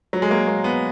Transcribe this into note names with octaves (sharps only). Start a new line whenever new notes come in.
F#3
G#3
A#3
A#3
B3